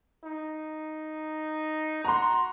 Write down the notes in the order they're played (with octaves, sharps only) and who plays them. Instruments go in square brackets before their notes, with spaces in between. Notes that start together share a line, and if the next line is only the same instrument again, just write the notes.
[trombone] D#4
[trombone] F#4 [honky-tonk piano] A#5 C6